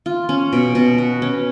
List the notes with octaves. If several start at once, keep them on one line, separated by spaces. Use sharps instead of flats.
F4
C#4
B2
B2
F#4
C#4